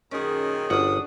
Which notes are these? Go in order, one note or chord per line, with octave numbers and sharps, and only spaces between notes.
F#2 A#2 D#3 C#4 G#4
G1 D4 F#4 F#5 D#6